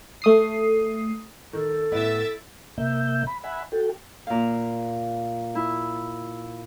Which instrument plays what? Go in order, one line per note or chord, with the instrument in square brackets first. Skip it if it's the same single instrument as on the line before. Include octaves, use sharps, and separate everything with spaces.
[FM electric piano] A3 D#6 C7
[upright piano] D#3 [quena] A4
[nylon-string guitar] A2 B3 [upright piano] E4 [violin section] E5 A6
[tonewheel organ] C3 A#3 E5 G6
B5
E5 F#5 G#5 B5
F#4 A4 G5
[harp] A#2 F5
E4